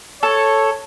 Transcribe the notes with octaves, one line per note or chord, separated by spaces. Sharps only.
A4 C#5